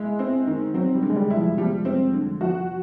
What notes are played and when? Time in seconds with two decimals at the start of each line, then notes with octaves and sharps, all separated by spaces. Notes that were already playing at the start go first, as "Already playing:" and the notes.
Already playing: G#3 E4
0.19 C4
0.47 D#3
0.74 F#3 C4
0.95 G3
1.02 D3
1.10 G#3
1.17 G3
1.30 E4
1.37 F3
1.58 F3 G3
1.85 C4
2.13 D3
2.41 F3 F#4